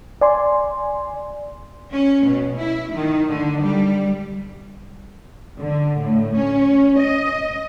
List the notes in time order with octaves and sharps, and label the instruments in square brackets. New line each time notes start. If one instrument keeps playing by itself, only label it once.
[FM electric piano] D5 G#5 C6
[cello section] C#4
B2
E4
D#3
D3
G3
D3
A2
C#4
D#5